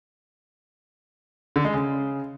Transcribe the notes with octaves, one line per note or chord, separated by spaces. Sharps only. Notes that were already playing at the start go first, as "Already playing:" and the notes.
D3
G#3
C#3